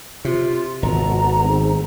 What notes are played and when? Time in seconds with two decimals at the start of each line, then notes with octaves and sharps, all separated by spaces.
0.25 C3 F4
0.83 G#1 B3 F#4 A4 A#5
1.44 D#3 G#3 C4